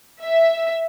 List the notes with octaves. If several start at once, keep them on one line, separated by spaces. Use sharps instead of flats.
E5